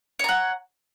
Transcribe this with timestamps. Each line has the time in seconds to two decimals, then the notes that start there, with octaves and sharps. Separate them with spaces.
0.19 C#5
0.24 A#5
0.29 F#5